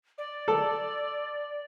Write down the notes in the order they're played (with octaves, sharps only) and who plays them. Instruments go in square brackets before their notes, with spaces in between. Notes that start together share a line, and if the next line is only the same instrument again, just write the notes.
[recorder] D5
[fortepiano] A4